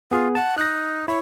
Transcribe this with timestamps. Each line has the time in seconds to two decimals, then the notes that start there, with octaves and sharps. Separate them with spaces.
0.11 B3 F4 G#4
0.35 F#5 A5
0.58 D#4 F#6 A#6
1.08 E4 C#5